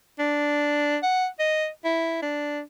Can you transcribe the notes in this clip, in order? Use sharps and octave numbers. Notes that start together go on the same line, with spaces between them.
D4
F#5
D#5
E4
D4